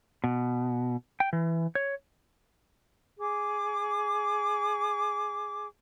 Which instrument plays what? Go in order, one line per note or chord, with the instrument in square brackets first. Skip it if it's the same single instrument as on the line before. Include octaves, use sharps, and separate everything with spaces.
[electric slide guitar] B2
G5
E3
C#5
[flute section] G#4 D6